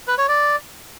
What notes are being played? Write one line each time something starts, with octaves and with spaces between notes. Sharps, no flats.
B4
C#5
D5